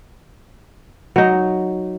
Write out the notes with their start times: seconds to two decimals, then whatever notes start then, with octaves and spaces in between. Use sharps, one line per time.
1.16 F#3 D#4